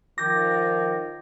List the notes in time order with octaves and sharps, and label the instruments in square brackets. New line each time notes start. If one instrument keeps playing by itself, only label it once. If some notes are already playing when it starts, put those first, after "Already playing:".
[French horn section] D#3 F3 [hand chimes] D6 G6 A6 [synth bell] A#6